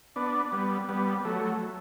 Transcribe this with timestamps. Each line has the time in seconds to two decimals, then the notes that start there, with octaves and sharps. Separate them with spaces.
0.16 B3 D4
0.52 G3 B3
0.89 G3 B3
1.25 F#3 A3